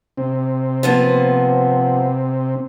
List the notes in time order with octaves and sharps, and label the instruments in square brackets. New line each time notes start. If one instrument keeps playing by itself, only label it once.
[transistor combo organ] C3 C4
[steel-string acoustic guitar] F3 A#3 B3